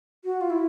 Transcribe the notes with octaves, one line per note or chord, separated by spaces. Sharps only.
F#4
F4
E4